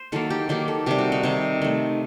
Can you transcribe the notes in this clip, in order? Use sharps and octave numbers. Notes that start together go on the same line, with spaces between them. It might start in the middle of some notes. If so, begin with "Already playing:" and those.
Already playing: C5
D#3 F#3 A#3 A4
G4
D#3 F#3 A#3 G4
A4
C3 D#3 G3 G4
F#4
D#4
C3 D#3 G3
D#3 A3